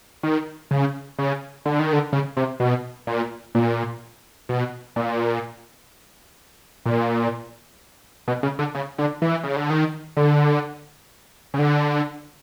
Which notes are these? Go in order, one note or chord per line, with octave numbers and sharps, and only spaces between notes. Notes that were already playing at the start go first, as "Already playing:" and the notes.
D#3
C#3
C#3
D3
D#3
D3
C#3
C3
B2
A#2
A#2
B2
A#2
A#2
B2
C#3
D3
C#3
D3
E3
C#3
D3
D#3
D3
C#3
D3